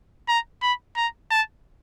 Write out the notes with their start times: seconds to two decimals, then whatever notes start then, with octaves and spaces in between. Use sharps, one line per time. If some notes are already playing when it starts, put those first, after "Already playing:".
0.28 A#5
0.62 B5
0.97 A#5
1.31 A5